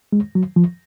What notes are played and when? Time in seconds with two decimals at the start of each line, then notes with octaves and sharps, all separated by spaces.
0.13 G#3
0.35 F#3
0.56 F3